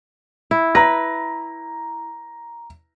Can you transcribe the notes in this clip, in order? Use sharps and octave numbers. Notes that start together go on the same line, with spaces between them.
E4
B4 A#5 A#6